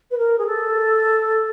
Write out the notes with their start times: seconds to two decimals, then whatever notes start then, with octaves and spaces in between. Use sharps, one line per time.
0.11 B4
0.17 A#4
0.38 G#4
0.46 A4